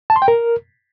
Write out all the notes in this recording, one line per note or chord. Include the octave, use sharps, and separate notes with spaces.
A5
C6
G5
A#4